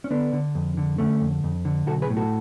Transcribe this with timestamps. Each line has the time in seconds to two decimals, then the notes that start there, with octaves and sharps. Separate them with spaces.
0.04 C#4
0.11 D3 B3 D4
0.33 D3
0.55 F2
0.77 D3
0.98 D3 A3 C#4
1.21 F2
1.44 F2
1.65 D3
1.87 B1 F#4 A4
2.02 G#4 B4
2.10 A2
2.17 F#4 A4